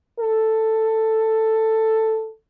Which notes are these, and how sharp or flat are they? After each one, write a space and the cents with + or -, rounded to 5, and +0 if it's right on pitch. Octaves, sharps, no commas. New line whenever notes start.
A4 +5